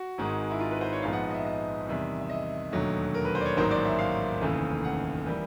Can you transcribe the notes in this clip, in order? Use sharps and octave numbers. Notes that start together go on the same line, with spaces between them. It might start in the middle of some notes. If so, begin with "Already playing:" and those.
Already playing: F#4
G#1 G#2 D#3 G#3
E4
F4
B4
C5
C#5
A#1 G#2 F3 G#3 B3 F5
F#5
D#5
E5
D#5
E2 C3 D#3 G3
E5
D#5
E1 D#2 D3 F#3 A3
A#4
B4
C5
D5
C#5
A1 G#2 D#3 F#3 A#3 C5
D5
E5
F5
F1 D#2 C#3 E3 A3
F#5
E3 G3 A#3